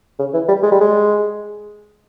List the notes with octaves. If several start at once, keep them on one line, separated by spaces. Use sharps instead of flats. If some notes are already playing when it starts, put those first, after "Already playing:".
C#3
E3
G3
G#3
G3
G#3